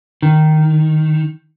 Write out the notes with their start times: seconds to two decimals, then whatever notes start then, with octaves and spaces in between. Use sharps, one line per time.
0.23 D#3